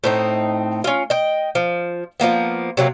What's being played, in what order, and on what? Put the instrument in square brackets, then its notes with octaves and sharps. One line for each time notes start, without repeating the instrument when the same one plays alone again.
[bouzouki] A2 C4 D#4
C#4 F4
D#5 G5
F3
F3 G#3 A#3 B3
C3 F#3 A#3